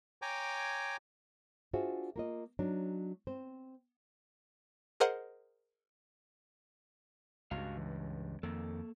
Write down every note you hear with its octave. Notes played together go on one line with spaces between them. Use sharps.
C#5 G5 G#5 A#5 D6
D4 F4 F#4 G#4 C5 E5
A#3 F4 D#5
F#3 D4 D#4
C4 C5
G#4 A#4 C5 D#5 F#5
C#2 G2 F#4 F5
E3
F2 D#3 A#3 A4